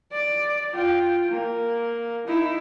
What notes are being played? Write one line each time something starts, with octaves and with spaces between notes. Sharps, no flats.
D5
F4 G5
A#3
D#4 E4